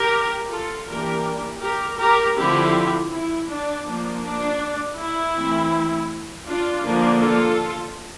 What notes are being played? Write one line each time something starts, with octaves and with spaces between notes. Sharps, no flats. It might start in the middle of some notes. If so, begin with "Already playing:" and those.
Already playing: G4 A#4
F4 A4
E3 G3 A#3 D4 G4 A#4
G4 A#4
G4 A#4
D3 F3 C4 E4 G4
E4
D4
F3 A#3 D4
D4
E4
E3 A3 C4
D4 F4
D3 F3 A#3 D4
F4 A4